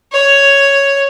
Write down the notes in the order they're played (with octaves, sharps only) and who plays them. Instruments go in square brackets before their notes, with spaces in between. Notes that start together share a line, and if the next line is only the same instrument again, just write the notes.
[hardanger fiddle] C#5